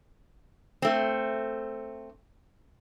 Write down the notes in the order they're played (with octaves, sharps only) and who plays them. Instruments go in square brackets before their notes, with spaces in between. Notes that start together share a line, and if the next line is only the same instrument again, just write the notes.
[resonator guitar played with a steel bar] A3 C4